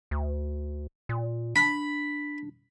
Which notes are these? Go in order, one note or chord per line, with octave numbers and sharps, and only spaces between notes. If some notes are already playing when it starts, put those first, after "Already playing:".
D2
A#2
D4 B5